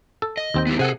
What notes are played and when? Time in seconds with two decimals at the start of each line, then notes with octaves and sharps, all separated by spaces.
0.22 A4
0.37 D#5
0.54 D#2 C4 G5
0.67 B3 E4 G4
0.79 C3 G#4 A4 F#5